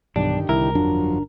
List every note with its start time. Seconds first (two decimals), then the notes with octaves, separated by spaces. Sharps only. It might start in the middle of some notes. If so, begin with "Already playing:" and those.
0.16 B1 G2 D3 D#3 D4 G4
0.49 C2 E4 A#4
0.75 G1 F2 F3 F#3 D4